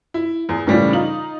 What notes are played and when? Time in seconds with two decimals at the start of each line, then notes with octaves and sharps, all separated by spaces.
0.14 E4
0.49 E2
0.67 A2 C#3 E3 F3 G3 A3
0.93 D#4 F4 F#7